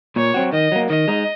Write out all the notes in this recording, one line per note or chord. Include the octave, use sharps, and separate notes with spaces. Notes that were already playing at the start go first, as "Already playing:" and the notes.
A#2 C#5
F#3 C4 F#4
D#3 D#5
F#3 A#3
D#3 D#5
G#3 D#4